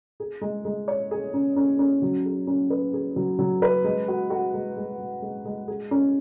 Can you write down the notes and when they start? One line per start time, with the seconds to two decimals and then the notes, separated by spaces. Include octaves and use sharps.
0.20 G#4
0.41 G#3
0.65 G#3
0.88 C#5
1.11 G#4
1.34 C#4
1.56 C#4
1.79 C#4
2.02 F#3
2.25 G#4
2.47 C#4
2.70 B4
2.93 G#4
3.16 F#3
3.39 F#3
3.62 B4
3.84 G#3
4.08 F#4
4.30 F#4
4.54 G#3
4.77 G#3
5.00 G#3
5.22 G#3
5.45 G#3
5.68 G#4
5.91 C#4